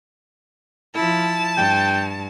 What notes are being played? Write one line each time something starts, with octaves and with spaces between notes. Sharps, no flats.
F3 E4 A5
G2 G5